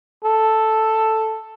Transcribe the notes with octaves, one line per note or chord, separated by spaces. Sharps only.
A4